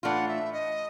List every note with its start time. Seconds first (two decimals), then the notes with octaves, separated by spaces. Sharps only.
0.03 A2 E3 A3 D4 F4 F#5
0.28 E5
0.52 D#5